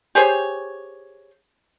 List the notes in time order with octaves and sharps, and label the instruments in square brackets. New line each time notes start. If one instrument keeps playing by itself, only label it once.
[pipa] G4 G#4 C5 C#5